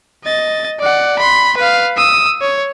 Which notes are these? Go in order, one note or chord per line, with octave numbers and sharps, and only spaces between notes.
D#5 A6
D5 F#5
B5 C6
B4 F5
D#6 E6
C#5